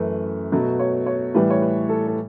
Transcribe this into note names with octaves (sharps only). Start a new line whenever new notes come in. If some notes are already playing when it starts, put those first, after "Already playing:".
Already playing: F#2 E3 A3 B4
B2 F#3 A3 B4
C#5
C#5
A2 E3 G3 B4
C#5
B4
A4
A4